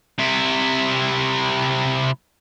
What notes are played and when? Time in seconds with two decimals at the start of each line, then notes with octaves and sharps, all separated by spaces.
0.19 C3 E4